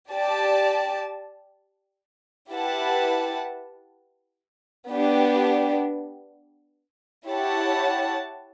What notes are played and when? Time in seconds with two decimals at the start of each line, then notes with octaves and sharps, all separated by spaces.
0.11 G4 D5 A5
2.50 E4 G4 B4 F#5 A5
4.89 B3 D4 G4
7.28 E4 G4 C#5 F#5 A5